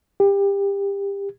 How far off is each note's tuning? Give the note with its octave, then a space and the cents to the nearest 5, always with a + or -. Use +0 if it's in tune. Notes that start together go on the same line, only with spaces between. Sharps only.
G4 +25